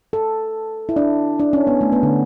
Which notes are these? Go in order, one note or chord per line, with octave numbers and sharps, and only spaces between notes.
A4
E4
D4
D4
C#4
B3
A3
B3
D3